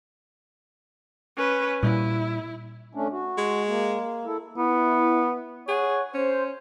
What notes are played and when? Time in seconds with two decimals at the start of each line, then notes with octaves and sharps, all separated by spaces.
1.37 C#4 B4
1.83 A#2 G3 E4
2.95 A3 C#4 D4
3.12 F#4
3.38 G#3
3.67 A#3
4.26 E4 A4
4.57 B3 E4
5.68 G#4 C#5 F#5
6.14 C#4 C5